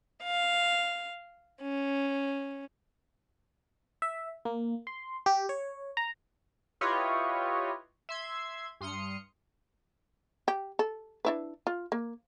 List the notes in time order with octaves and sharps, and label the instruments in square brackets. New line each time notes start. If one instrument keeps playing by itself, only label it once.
[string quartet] F5
C#4
[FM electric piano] E5
A#3
C6
G4
C#5
A#5
[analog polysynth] E4 F4 G4 B4 C#5 D#5
E5 C6 G#6
G2 C6 D#6 F6 C#7
[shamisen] G4
A4
D4 E4 B4
F4
A#3